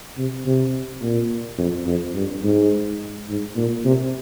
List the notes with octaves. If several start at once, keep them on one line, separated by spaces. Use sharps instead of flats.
C3
C3
A#2
F2
F2
G2
G#2
G#2
A#2
C3